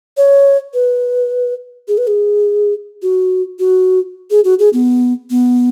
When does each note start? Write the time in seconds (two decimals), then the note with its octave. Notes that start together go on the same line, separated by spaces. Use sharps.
0.17 C#5
0.74 B4
1.88 G#4
1.98 B4
2.07 G#4
3.02 F#4
3.59 F#4
4.30 G#4
4.44 F#4
4.59 G#4
4.73 B3
5.30 B3